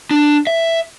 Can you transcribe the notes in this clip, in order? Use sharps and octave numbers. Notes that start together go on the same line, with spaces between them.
D4
E5